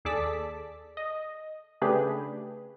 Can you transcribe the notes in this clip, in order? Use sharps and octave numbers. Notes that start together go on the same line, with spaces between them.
D#2 G#4 A4 D5 A5 B6
D#5
C#3 A3 D4 G4 G#4 B4